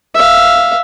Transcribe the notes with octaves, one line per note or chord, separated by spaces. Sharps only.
E5 F5